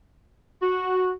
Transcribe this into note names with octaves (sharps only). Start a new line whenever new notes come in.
F#4